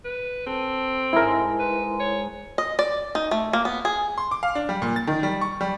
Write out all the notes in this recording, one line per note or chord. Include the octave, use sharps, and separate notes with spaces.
B4
C4 A4
G#2 G#3 E4 A#4
B4
C#5
D#5
D5
D#4
A3
A#3
B3
G#4
C6
D6
F5
D4
G3
A#2
A6
D#3
G3
C#6
G3